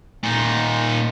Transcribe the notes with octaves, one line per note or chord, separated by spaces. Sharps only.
A#2 D#4